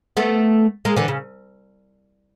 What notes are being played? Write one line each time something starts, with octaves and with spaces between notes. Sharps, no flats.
A3 B3
G#3 A#3
D3 E3
C#3